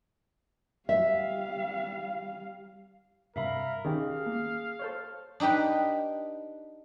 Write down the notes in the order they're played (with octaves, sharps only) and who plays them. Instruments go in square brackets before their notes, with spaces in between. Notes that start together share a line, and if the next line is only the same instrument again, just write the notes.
[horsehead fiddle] G3 F5 [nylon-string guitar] E5
[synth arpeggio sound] G2 C3 [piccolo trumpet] A#4 [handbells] E5 F5 B5
[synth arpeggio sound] D#3 C#4 G4 [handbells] G#4 [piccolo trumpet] F5
[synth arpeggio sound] A#3
A4 C5 C#5
[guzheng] D4 D#4 G4 B4 G5